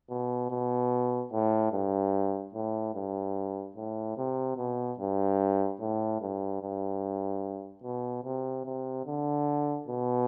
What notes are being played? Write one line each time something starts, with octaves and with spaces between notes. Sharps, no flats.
B2
B2
A2
G2
A2
G2
A2
C3
B2
G2
A2
G2
G2
B2
C3
C3
D3
B2